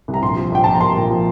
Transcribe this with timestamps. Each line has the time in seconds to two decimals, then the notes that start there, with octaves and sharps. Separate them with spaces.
0.08 C2
0.14 A#5
0.22 A#1 C6
0.36 F3
0.52 A#1 G5
0.64 A#1 A5
0.73 A#5
0.81 A#2 C6
0.96 A#2
1.10 F3